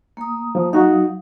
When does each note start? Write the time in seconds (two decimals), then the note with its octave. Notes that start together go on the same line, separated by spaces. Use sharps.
0.17 A#3 D#6
0.55 F3
0.73 F#3 D#4 F#4 F5 D#6